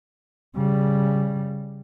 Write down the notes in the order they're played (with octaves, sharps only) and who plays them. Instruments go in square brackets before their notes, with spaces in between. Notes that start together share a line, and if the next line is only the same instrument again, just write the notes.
[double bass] C#3 G3